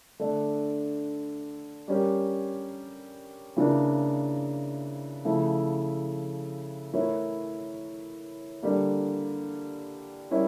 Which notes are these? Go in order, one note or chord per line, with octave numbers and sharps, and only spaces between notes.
D3 A3 D4
G3 C#4 G4 A#4
C#3 E3 A#3 D4
C#3 F3 A3 E4
E3 A3 E4 A#4 C#5
D3 G3 A#3
G3 C#4 E4 A#4 C#5